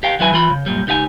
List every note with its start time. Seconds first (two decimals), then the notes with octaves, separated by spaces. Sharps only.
0.03 G4 F5 G5
0.19 D#2 F#3 E4 B4 G#5
0.33 E3 F4 B5
0.50 C#3
0.66 F#2 A#2 G3
0.87 C#2 D#4 G4 F5 G#5